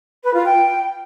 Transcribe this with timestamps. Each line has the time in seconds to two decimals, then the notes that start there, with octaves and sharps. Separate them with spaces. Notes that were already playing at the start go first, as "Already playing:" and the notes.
0.23 B4
0.34 F4
0.44 G5